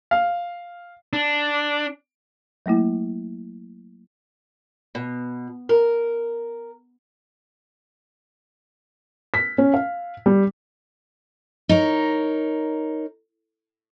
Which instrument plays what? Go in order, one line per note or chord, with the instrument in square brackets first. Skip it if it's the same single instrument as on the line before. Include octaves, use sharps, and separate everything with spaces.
[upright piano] F5
[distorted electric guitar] D4
[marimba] F#3 A3 A#3 E4
[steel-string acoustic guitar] B2
A#4
[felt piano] B6
C#4
F5
G3
[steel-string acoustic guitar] D#4 A#4 C#5